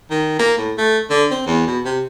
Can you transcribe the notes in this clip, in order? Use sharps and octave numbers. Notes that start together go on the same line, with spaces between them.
D#3
A#3
A2
A3
D3
C4
E2
B2
C3